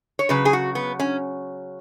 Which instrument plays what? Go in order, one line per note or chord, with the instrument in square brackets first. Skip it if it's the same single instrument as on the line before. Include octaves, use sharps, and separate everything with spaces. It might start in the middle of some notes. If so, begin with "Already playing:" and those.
[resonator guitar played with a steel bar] C#5
C#3 F#3 B4
G#4
F#4
B3
C#4